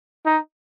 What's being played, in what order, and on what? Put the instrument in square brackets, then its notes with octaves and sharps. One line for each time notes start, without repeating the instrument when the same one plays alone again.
[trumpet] D#4